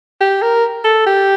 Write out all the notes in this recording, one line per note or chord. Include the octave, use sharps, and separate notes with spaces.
G4
A#4
A4
G4